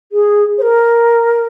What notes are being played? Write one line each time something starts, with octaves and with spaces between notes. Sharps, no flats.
G#4
C5
A#4